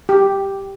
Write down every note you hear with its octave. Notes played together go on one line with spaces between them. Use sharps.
G4